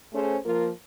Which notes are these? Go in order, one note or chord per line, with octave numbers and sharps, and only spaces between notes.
A3 C#4 G#4 C5
F3 A#3 F4 A#4